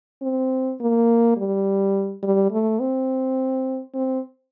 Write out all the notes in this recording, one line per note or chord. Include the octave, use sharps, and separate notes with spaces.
C4
A#3
G3
G3
A3
C4
C4